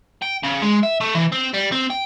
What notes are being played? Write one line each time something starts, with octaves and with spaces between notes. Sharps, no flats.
G5
C#3
G#3
E5
A3
E3
C4
G3
C4
G5